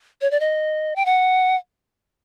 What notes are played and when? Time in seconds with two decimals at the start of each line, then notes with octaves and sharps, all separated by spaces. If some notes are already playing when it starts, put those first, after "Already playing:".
0.21 C#5
0.31 D5
0.40 D#5
0.96 G5
1.06 F#5